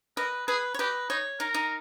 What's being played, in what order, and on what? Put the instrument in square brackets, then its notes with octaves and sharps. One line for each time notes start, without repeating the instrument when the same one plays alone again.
[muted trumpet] A#4 [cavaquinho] B4 D#5
[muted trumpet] G#4 [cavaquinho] B4
[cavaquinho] C#5
[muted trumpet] G4 [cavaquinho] B4 D#5
[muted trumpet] D#4 [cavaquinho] C#5
[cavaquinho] D#4 [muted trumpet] A#4
[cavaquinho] D#4